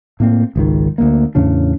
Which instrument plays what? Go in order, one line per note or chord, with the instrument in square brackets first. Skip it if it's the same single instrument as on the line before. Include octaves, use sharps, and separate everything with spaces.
[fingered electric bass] A2 A#3 C4
G#1 C#2 D#3
D2 G#3 A#3
E2 A2 C#3 D4